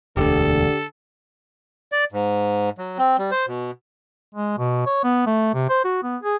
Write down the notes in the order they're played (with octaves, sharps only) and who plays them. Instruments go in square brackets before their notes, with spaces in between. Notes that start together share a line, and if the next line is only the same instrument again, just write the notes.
[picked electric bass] E1 D2 [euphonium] D3 [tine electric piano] G4 [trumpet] A4
[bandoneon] D5
G#2
F#3
C4
G3
C5
B2
[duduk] G#3
B2
C#5
B3
A3
C3
C5
F#4
B3
G#4